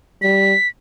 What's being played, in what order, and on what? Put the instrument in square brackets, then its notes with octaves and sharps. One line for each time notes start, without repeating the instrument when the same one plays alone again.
[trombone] G3 [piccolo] B6